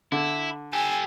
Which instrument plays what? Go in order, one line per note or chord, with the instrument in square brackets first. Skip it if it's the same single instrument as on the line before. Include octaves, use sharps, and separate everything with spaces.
[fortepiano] D3 [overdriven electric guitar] E4
[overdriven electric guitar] G4 A4 [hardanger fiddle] G#5